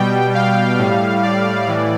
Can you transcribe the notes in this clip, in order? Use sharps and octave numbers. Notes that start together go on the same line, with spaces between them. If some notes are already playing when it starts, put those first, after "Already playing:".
Already playing: B2 G3 G5
F5
A2 G3
D5
A2 E3